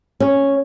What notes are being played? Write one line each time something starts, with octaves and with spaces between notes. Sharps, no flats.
C#4